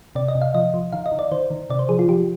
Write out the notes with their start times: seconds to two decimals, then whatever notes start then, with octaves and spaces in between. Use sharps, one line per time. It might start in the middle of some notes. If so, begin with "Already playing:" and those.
0.15 C3 D5
0.28 D#5
0.35 C3
0.42 F5
0.54 F3 D#5
0.74 F3
0.93 D#3 F5
1.06 D#5
1.12 D#3
1.19 D5
1.31 D#3 C5
1.50 D#3
1.70 C3 D5
1.79 C5
1.89 F3 G#4
1.99 F4
2.08 F3 G4